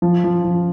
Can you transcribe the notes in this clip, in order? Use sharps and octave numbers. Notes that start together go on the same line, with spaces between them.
F3
F3
F3